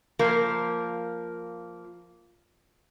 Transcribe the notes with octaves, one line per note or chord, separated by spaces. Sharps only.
F3 A#3 A#4